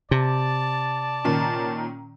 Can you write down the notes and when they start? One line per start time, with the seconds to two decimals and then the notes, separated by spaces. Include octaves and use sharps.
0.11 C3 D5 A5
1.24 A#2 D#3 C#4